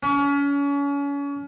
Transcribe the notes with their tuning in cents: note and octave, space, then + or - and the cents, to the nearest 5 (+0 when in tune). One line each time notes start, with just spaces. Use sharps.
C#4 +35